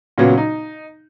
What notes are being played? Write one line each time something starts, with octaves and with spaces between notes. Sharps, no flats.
A#2 C#3 F#3 B3
D#4